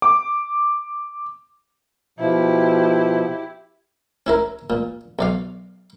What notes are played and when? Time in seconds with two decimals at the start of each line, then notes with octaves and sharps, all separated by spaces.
0.02 D6
2.19 B2 F3 E4 G4
4.26 C#4 E4 A#4
4.70 A#2
5.19 B1 D5 F5